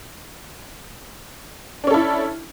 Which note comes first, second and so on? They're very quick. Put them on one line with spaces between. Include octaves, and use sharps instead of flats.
D4 C#4 A4 E4